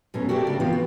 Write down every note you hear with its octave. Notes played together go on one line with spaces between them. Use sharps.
F#2 B2 A3 C#4
F#4 G4 A4 A#4 D5 E5
C#3 A3
E3 F3 B3 C4 F4
F#4